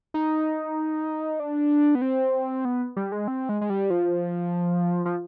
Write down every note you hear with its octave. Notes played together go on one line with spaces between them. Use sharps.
D#4
D4
B3
C4
B3
G3
G#3
C4
G#3
G#3
G3
F3
F3